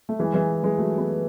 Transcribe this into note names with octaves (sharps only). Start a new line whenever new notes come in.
A3
E3 G#3
E3 G#3
E3 G#3
F#3 A3
G#3 B3